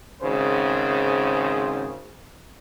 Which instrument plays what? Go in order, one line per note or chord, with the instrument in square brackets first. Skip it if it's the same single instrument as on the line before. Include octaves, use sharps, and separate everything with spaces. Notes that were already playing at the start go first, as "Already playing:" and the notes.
[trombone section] G#1 C#3 C5